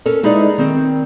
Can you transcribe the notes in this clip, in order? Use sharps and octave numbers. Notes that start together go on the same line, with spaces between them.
C#4 A4 A#4
G#3 D#4 E4 G#4 B4 D5
D#3 C4